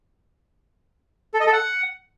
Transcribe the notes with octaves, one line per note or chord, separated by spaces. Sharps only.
A4
D#5
A4
F#5